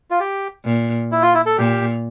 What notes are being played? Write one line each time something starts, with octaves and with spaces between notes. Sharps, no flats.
F4
G4
A#2
E4
F4
E4
A4
A#2 G4